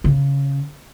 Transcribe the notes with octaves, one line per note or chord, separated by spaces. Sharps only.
C#3